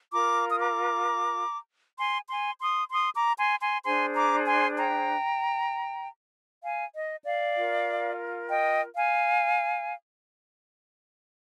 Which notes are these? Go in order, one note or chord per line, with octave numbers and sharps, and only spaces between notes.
F4 A#4 A#5 D6
D#6
A#5 D6
G#5 C6
G#5 C6
C6 D#6
C6 D#6
A#5 D6
G#5 C6
G#5 C6
D4 G#4 C5 G#5 C6
A#5 D6
G#5 C6
G5 A#5
F5 G#5
D#5
D5 F5
F4 A#4
D#5 G5
F5 G#5